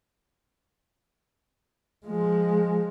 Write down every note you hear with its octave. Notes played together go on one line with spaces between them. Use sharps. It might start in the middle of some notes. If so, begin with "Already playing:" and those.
F3 G#3